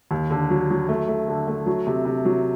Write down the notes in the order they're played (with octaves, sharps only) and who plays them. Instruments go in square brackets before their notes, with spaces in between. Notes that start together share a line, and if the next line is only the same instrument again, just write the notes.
[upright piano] D#2
D3
F#3
F#3
A3
A3
D3
A3
F#3
C3
C3
F#3